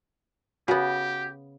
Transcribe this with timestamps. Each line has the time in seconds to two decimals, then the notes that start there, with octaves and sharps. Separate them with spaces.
0.68 C#3 B3 F#4 G4